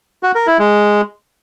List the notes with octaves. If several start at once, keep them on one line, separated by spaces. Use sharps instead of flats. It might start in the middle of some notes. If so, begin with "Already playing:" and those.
F#4
A#4
E4
G#3